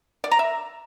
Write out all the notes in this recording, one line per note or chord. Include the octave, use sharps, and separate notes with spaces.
D5
A#5
E5